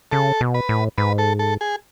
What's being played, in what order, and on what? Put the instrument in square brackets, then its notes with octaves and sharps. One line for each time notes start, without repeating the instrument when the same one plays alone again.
[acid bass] C#3 [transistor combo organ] A4
[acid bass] B2
[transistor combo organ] B4
[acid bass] A2
[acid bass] G#2 [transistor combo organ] B4
[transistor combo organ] A4
A4
G#4